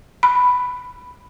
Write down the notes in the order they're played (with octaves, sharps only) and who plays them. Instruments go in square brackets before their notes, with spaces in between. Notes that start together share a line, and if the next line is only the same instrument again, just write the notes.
[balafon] B5